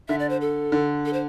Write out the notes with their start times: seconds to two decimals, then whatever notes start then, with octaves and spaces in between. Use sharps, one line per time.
0.08 D3 E5
0.19 D5
0.30 C5
0.41 A4
0.72 D3
1.05 A4
1.13 C5